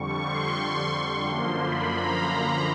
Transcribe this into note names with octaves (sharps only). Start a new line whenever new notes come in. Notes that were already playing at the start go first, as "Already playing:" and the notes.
Already playing: F2 D3 G3 C#6
C6
F#2 D3 F3 A#3
B5
A#5